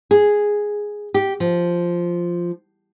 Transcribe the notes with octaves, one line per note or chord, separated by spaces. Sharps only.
G#4
G4
F3